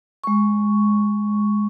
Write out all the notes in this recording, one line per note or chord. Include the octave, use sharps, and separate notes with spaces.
G#3 C#6